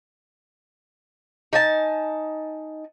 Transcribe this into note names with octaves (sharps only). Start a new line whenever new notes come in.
D#4 G#5 A5